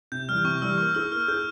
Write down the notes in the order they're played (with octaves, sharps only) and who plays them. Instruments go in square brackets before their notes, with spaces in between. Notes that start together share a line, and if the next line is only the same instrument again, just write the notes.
[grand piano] C3 [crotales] G6
[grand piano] E3 G3 [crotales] F6
[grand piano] C3 [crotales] C#6
[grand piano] E3 G3 [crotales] E6
[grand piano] A#3 [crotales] C#6
[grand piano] E4 G#4 [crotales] E6
[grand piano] A#3 [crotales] F6
[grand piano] E4 G#4 [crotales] G6